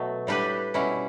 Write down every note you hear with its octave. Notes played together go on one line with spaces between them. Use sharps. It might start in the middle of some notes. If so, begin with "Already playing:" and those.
Already playing: B2 F#3 A3
A2 G3 D4 G4 B4
B2 G3 C#4 E4